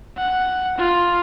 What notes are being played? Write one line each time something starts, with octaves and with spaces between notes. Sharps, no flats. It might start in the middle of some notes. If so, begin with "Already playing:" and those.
F#5
F4